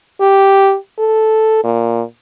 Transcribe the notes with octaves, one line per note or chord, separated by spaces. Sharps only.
G4
A4
A#2